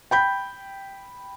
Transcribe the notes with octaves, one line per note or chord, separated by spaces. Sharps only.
G5 B5 G6